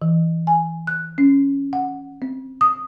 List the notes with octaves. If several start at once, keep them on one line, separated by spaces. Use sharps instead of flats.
E3
G#5
F#6
C#4
F#5
C4
D#6